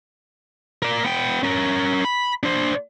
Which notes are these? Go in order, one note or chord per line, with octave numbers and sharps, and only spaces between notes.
A#4 D5
B3 G5
C#4 A#4
B5
D4 C5